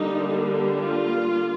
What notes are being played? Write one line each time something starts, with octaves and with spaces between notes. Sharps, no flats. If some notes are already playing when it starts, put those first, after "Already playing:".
Already playing: D3 G3 A#3 D4 D#4
F4